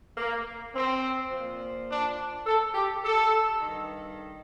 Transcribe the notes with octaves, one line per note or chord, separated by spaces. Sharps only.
A#3
C4
A#2 F3
D4
A4
G4
A4
G2 D#3